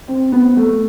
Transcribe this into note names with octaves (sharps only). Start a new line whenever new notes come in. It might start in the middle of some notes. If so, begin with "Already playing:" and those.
C4
B3
A3